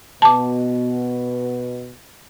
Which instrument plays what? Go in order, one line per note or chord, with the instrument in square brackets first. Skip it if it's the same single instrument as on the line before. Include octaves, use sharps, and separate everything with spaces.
[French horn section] B2 [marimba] A5 D6